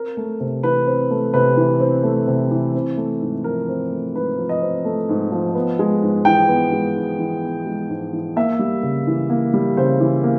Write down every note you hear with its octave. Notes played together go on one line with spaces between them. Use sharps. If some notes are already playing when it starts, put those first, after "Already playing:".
Already playing: C4 A#4
A3
C3
E3 B4
C4
A3
C3 B4
E3
C4
A3
C3
E3
C4
A3
G#2
F3 A#4
C4
A3
G#2 B4
F3
D#5
C4
A3
G#2
F3
B3
G#3
G#2
E3 G5
B3
G#3
G#2
E3
B3
G#3
G#2
E3
A#3 E5
G3
C#3
E3
A#3
G3
C#3 C5
E3
A#3